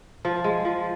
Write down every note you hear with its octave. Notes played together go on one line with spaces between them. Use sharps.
F3
G#3
F3